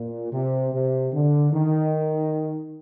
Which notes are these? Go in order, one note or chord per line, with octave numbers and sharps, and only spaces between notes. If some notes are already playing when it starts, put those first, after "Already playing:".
Already playing: A#2
C3
C3
D3
D#3